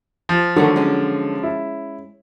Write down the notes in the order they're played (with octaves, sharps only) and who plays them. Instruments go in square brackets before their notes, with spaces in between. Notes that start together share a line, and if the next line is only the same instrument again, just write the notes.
[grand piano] F3
[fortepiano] D3 F#3 [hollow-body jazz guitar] D#3 A3 F#4
[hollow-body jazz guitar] G#3 C#4
[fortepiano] E4